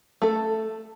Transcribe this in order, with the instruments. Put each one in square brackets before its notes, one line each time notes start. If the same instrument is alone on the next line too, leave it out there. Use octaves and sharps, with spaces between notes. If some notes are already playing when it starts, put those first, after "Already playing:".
[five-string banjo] A3 A4